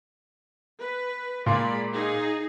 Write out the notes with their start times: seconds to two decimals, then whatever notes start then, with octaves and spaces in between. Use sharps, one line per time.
0.80 B4
1.46 A#2 G#3 A#3 D5 B5 C6
1.94 D#4 G#4